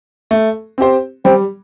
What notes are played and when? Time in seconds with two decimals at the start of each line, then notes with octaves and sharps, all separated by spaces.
0.31 A3
0.78 C4 G4 C5
1.25 G3 C4